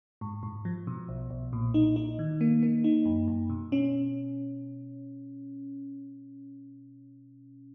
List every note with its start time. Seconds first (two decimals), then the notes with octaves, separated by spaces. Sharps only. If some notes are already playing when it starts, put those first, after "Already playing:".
0.21 G#2
0.43 G#2
0.65 F3
0.87 B2
1.08 B1
1.30 B1
1.53 A#2
1.74 D#4
1.96 D#4
2.19 D#3
2.41 A#3
2.63 A#3
2.84 D#4
3.05 F#2
3.28 F#2
3.50 B2
3.72 C#4